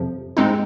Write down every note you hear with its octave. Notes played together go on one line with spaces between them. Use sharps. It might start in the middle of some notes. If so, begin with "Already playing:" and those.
Already playing: F2 C3 F3
G#2 G#3 C4 D#4